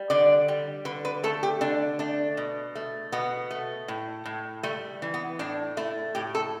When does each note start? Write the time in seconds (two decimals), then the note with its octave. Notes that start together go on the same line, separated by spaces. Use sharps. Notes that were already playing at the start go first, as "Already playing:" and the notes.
Already playing: G3
0.10 D3 D5
0.48 G3
0.85 D3 B4
1.05 B4
1.24 A3 A4
1.43 G4
1.61 D3 D4
1.99 A3 D4
2.37 B2
2.75 A3
3.12 B2 B3
3.51 A3
3.88 A2
4.25 A2
4.63 G3 A3
5.02 E3
5.14 B3
5.39 A2 D4
5.77 A3 E4
6.15 A2 G4
6.35 A4